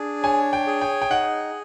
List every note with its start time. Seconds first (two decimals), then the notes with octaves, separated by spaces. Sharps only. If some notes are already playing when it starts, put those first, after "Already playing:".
Already playing: D4 G#4
0.23 C#5 G#5
0.53 G5
0.67 G#4
0.81 G5
1.02 G5
1.11 D#4 F#5